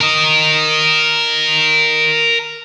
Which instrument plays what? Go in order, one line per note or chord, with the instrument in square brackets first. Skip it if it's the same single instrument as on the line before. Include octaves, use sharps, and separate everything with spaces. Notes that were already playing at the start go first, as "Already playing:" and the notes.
[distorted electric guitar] A#4 D#5